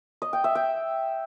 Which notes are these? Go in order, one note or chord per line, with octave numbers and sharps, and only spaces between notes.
D#5
G5
E5
G5